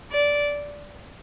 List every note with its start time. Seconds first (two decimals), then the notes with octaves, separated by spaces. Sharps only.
0.12 D5